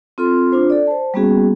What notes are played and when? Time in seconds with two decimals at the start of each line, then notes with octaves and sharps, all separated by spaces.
0.18 C4 F4 A4 C6
0.52 D4 F4 C5
0.70 A4 D5
0.87 C5 A5
1.14 G3 A#3 B3 C#4 F#4 G#4